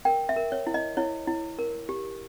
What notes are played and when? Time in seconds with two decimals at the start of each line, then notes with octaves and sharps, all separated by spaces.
0.05 A#4 G5
0.29 E5
0.36 A#4
0.52 C#5
0.67 E4
0.74 D#5
0.97 E4 C#5
1.27 E4
1.59 A#4
1.89 G4